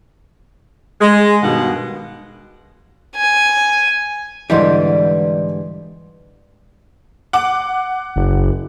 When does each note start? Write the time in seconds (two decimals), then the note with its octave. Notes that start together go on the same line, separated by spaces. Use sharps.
1.00 G#3
1.42 G2 B2 D#3 F5 F#5
3.16 G#5
4.50 G#2 D3 E3 G3 B4 D5 D#5 C6
7.33 F#5 D6
8.16 F#1